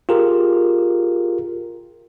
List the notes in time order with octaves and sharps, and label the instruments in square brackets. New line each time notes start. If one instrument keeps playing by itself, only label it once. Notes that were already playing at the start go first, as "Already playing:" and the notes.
[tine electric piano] F4 G4 G#4 A#4